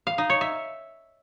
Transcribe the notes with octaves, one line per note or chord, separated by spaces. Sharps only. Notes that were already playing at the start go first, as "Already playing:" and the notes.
F5
D#4
C#5
E5